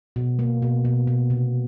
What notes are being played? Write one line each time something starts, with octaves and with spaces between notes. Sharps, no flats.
B2
A#3
B2
B2
B2
C3